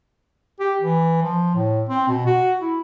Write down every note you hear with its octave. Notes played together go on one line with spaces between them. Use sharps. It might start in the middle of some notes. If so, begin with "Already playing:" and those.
G4
E3
F3
A2
C4
B2
F#4
E4